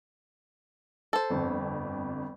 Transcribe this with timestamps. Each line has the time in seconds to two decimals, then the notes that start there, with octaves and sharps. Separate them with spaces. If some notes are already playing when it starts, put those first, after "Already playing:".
1.13 A4 C5
1.30 G1 F2